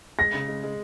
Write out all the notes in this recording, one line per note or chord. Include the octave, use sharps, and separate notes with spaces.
G#3 A#6
C#3
G#3
G#3